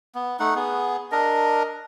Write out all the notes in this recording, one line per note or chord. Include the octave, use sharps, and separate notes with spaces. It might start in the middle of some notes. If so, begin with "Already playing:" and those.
B3
A3 D#4 F#5
B3 G#4
D4 A#4 D#5